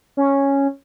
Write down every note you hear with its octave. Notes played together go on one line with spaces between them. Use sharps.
C#4